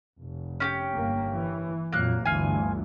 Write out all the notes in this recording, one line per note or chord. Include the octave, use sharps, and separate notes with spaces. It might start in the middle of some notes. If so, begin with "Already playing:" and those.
F1
C#4 F#4 G4
G1 A#3
E3
F2 A#2 F#3 A#3 F#6
G1 D2 E3 F4 G#5